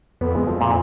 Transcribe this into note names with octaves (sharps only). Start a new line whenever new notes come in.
F2 B3
G#3
F3
A#2